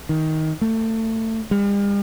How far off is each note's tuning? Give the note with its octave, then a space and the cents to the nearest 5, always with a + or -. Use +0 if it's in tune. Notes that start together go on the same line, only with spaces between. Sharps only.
D#3 +15
A3 +25
G3 +45